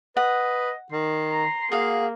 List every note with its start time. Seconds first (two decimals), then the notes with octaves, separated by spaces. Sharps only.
0.17 B4 D#5 F#5
0.92 D#3 C6
1.31 A#5
1.72 A#3 F#4 G#4 F5